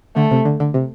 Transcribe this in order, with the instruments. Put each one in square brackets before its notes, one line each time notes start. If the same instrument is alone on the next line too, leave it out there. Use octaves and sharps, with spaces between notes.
[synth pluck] D3 [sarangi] A3
[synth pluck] C3
D3
D3
C3